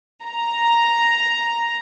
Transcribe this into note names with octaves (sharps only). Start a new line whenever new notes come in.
A#5